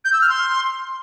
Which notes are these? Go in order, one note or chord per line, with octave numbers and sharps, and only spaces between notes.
G6
E6
F6
C6